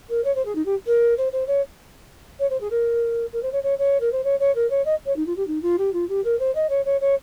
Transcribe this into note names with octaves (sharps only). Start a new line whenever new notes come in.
A#4
C#5
C5
G#4
D#4
G4
A#4
C5
C5
C#5
C#5
C5
G#4
A#4
A#4
C5
C#5
C#5
C#5
A#4
C5
C#5
C#5
A#4
C#5
D#5
C#5
D#4
F4
G4
D#4
F4
G4
F4
G4
A#4
C5
D#5
C#5
C#5
C#5